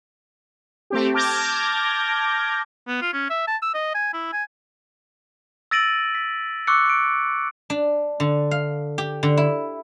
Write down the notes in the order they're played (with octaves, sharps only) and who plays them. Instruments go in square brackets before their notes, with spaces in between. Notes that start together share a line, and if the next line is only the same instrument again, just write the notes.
[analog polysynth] A3 C4 G4
A5 D6 F6 G6 G#6 A#6
[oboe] B3
F4
C#4
E5
A5
E6
D#5
G#5
E4
G#5
[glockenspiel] E6 A6 A#6 D7 D#7 F#7
B6
C#6 D6 E6 F#6 C#7
C#7 D7
[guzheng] D4
D3
F5
G4
D3
E4